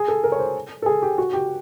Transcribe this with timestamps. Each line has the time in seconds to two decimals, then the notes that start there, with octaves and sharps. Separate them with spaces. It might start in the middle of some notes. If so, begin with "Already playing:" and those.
Already playing: G#4
0.08 A4
0.24 A#4
0.32 C#5
0.39 C5
0.82 A4
0.86 G#4
1.02 G4
1.18 F#4
1.33 G4